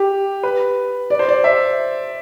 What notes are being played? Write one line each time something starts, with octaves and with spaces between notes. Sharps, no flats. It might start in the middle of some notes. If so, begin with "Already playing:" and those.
Already playing: G4
B4
D5
C5
D5
E5